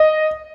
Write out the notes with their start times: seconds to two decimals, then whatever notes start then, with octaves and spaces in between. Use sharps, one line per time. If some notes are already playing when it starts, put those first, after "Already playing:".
Already playing: D#5